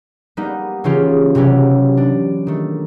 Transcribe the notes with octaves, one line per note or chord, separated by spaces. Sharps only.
G3 A#3 B3 D#4
C#3 E3 C#4 F4 G4
C3 E3 F#3 C#4 G4
D4
D#3 A3